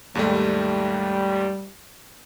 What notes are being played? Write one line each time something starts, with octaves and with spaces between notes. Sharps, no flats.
D#2 G#2 G3 A3